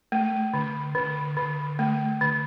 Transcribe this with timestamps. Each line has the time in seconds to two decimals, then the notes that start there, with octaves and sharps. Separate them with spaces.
0.12 A3
0.54 D3
0.95 D3
1.37 D3
1.79 A3
2.21 D3